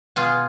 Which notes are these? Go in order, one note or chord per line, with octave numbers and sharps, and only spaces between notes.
B2 F4 G#4